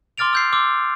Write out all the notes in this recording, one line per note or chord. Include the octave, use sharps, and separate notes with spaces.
C6 D6 F6 A6 D7 F7
E6 G6 C7
C6 D6 E6